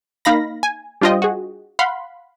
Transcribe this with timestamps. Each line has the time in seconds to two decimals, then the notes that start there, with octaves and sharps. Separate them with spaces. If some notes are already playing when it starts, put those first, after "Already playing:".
0.25 A#3 D#4 F5 B5 A#6
0.63 G#5
1.01 G3 D4 F4 C5 D#5 G5
1.22 F#4 G#4
1.79 F5 F#5 B5 C6